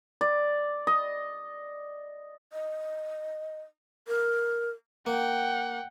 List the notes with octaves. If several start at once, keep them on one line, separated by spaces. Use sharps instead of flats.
D5
D#5
D#5
A#4
A#3 F#5 G5